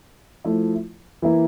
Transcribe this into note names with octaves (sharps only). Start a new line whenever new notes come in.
F3 A3 E4
E3 A#3 E4